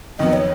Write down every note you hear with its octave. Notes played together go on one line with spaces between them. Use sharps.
F2 D#3 F#3 B3 D#5
C#5